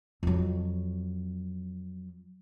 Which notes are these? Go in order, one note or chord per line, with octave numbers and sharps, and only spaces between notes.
F2 F#3